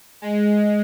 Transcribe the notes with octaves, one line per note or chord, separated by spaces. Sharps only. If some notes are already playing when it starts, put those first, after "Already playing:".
G#3